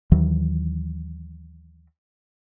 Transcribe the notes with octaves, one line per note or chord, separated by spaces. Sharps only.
D#2 D#3 E3 F#3